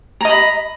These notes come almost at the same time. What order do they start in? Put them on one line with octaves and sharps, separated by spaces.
A#5 D#5 B5